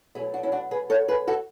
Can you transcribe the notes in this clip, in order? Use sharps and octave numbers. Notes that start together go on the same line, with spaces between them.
B2 F#3 A3 E4 G#4
D4 F#4
C#4 E4
D4 F#4
G#4 B4
A4 C#5
G#4 B4
F#4 A4